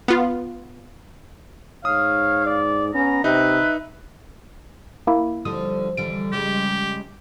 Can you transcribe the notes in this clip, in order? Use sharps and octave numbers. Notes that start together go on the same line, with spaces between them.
B3 F4
G#2 C#5 F5 D#6
D5
B3 C#4 A#5
C3 D#4 B4 E5
A#3 E4
D3 F3 G3 D#6
D3 E3 G3 D7
C#3 G3 G#3 G4